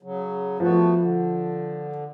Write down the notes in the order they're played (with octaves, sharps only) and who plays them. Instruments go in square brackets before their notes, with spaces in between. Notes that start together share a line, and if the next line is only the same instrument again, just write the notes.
[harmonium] C#3 F#3
[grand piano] F3 [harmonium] A3 B3 F#4
[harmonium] D3